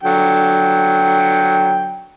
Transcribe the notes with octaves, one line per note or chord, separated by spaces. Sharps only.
D3 F#3 G5